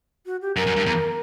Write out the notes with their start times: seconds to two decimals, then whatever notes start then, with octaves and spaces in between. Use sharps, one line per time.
0.26 F#4
0.42 G4
0.56 F#2 A#4
0.67 F#2
0.76 G2
0.86 E2